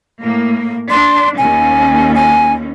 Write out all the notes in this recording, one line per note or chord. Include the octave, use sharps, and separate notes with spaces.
A2 A#3
D4 C6
D#2 C#4 G#5
G#5